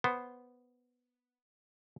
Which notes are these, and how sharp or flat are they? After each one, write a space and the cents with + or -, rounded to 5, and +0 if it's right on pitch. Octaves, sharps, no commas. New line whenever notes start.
B3 +0 C5 +0